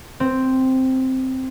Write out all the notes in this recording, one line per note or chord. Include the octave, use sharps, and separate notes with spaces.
C4